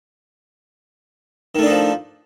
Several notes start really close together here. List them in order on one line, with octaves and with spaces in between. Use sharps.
D#3 A3 D4 D#4 F3